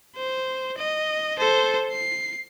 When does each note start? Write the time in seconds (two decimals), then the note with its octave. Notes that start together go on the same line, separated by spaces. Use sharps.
0.16 C5
0.78 D#5
1.38 A4 C5
1.91 C7